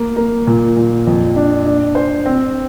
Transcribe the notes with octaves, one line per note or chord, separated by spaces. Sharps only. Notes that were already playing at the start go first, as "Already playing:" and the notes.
Already playing: A#3
A#3
A#2
A#2
F2
D4
D4
C5
C4